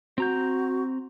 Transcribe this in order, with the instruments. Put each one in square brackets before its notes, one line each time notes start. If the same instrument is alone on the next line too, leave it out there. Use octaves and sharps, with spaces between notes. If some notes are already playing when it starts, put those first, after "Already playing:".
[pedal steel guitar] C4 A#5 G6 [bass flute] F#4